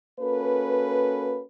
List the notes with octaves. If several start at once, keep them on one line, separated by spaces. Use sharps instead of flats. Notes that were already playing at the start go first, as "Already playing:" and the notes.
A#3 C#4 F#4 A4 B4